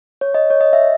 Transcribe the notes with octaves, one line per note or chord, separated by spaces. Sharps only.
C#5
D#5
C#5
D#5
E5